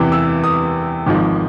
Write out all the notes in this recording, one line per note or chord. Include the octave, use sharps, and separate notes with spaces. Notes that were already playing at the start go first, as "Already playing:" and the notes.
Already playing: E2 C3 E3
E6
D#6
G#1 G#2 F3